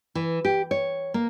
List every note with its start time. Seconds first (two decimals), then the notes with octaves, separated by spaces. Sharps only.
0.15 E3
0.45 G4
0.71 C#5
1.14 A#3